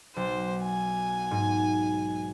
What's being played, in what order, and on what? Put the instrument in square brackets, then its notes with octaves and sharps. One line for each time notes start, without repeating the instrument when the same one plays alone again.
[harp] B1 [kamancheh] C5
[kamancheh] G#5
[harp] G#2